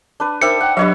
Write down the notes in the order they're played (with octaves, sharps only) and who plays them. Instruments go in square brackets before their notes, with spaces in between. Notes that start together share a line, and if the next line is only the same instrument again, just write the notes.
[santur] D4 B4
[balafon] D#4 C5 [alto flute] A#4 [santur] D5 E5 G5 [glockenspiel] C#7
[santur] F#5 [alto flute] G5
[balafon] F#3 D4 G4 [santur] B3 C#5 E5 [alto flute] D#5